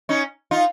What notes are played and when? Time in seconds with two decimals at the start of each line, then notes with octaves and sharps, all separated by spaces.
0.09 C#4 D#4
0.51 D#4 F4